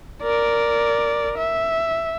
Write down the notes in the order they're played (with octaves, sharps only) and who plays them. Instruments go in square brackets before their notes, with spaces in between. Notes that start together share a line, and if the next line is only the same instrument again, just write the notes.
[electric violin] A#4 D5
E5